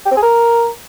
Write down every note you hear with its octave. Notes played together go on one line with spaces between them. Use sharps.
G4
C4
G#4
A#4